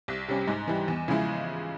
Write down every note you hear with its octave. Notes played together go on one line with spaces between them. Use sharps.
C2
C3 G3 C#4
G#2
E3 G3
E2
C#3 F3 G#3 E4